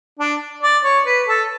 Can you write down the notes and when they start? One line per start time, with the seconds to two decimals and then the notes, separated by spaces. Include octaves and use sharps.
0.19 D4
0.63 D5
0.84 C#5
1.06 B4
1.28 A4